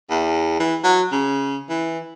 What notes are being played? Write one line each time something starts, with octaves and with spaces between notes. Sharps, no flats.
E2
E3
F#3
C#3
E3